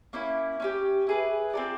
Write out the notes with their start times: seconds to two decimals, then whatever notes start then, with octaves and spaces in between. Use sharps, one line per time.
0.13 A#3 C#4 E4
0.60 C#4 E4 G4
1.07 E4 G#4 B4
1.53 C4 F4 A4 D5